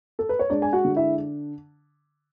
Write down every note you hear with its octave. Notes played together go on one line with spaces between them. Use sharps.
A4
B4
C#5
G#3 D4 D5
G#5
F#4 F#5
D3
E4 E5